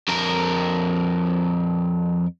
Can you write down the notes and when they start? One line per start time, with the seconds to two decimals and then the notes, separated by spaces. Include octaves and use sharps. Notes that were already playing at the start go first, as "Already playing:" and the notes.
0.09 F2 A#4